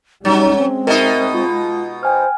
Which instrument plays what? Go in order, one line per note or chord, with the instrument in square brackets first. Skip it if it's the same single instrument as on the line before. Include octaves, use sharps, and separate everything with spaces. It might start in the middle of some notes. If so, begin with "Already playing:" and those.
[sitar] F#3 [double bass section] G3 C#4 [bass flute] D#4
[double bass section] G#3 [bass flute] C4
[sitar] B2 D#4 [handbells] A#4 D#5 E5
[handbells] F4
[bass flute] C5 [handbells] G5 G#5 F6